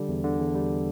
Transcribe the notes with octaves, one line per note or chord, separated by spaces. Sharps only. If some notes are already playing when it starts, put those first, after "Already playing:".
Already playing: D3 G3
E2
D3
E2
G3